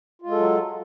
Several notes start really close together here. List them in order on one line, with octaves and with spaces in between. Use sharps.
F4 G#3 A4 F#3